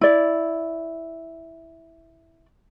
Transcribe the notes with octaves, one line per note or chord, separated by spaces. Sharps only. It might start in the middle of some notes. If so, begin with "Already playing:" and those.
E4 D5